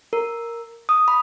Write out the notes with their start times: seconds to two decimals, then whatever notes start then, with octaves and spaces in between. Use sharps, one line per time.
0.13 A#4
0.89 D#6
1.08 B5